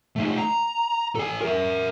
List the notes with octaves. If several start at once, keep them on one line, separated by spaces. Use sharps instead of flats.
A3 D#4
A#5
A4 G#5
A#4 E5